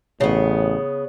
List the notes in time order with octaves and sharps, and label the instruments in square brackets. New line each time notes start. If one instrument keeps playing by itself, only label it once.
[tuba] A1 [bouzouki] C#3 B3